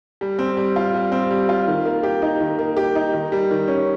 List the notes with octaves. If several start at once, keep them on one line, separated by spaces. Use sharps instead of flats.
G3
C4
G3
F4
G3
C4
G3
F4
D#3
A#3
G4
D#4
D#3
A#3
G4
D#4
D#3
G3
D#3
C#4